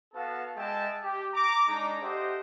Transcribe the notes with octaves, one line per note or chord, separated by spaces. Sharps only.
B3 F#4 A4 F5 A5
G#3 E5 G5 A5
G4
A#5 D6
G#3 D4 D#4 A#5 D6
G4 A4 C5 D#5 E5 F#5